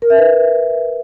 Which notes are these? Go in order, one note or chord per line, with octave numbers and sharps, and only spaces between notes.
A#4
E5
B4